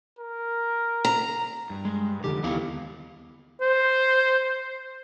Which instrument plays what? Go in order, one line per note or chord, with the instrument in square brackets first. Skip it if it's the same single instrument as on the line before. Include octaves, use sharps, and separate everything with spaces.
[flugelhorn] A#4
[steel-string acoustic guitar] A#5
[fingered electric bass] G2
[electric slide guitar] G#3
[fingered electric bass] F2 D3 D#3 [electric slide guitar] G4
[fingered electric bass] D#2 [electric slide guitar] B3 E4 F5
[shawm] C5